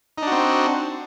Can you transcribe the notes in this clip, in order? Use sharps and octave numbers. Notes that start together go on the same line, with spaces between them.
C4 D4 D#4 F#4